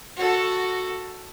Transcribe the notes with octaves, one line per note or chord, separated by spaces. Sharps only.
F#4 A4